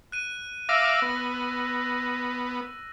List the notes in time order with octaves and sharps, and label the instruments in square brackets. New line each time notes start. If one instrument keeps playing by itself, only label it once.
[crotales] F#6 D#7
[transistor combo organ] E5 F5 D6 [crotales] E6 A#6
[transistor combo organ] B3